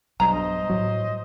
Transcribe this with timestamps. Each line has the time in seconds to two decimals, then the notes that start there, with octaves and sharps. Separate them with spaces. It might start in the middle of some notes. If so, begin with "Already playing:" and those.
0.20 B1 G2 F#3 C5 D#5 A#5
0.70 A2 F#3